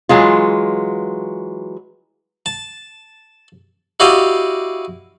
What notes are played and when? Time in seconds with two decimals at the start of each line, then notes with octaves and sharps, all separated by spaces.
0.09 E3 F#3 G#3 F4
2.46 A5
4.00 E4 F#4 G4 D5 D#5 F5